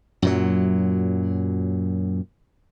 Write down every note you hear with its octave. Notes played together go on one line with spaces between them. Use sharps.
F#2 A#2 F#3